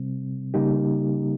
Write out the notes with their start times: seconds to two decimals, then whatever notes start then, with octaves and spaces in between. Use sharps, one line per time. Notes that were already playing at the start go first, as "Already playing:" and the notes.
Already playing: C3 G3 C4
0.54 C#3 G3 A#3 D#4 G4